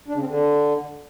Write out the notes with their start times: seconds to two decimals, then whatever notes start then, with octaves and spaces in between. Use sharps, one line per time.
0.08 D4
0.14 C#3
0.21 C4
0.27 D3